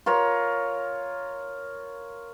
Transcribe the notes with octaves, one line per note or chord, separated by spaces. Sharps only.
F4 A#4 C#5